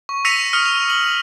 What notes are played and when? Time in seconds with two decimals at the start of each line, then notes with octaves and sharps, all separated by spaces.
0.09 C#6
0.25 E6 A#6 B6 C#7 D#7 F7
0.53 D#6 F6 C#7
0.66 F7
0.90 F#7